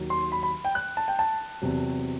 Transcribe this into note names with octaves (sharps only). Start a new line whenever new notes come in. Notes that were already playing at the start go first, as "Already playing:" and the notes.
Already playing: D#2 D#3 F#3
C6
B5
B5
G5
F#6
A5
G5
A5
E2 C3 F#3